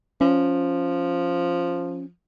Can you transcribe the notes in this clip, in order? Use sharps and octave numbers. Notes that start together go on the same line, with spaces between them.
F3 C#4